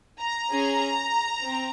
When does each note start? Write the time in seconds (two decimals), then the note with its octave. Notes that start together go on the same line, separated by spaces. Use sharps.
0.20 A#5
0.50 C#4 G#4
1.41 C4